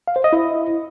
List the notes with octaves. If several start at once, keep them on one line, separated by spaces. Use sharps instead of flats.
F5
C5
D#5
E4